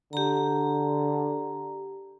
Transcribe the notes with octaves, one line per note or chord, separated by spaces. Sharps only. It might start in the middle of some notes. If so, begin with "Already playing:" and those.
D3 G4 A#5